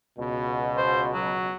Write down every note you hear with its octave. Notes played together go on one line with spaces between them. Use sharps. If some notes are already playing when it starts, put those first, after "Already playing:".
C#2 B2
C5
F#3